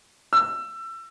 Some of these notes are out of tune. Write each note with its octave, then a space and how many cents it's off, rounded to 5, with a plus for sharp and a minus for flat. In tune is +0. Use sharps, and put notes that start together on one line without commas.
E6 +25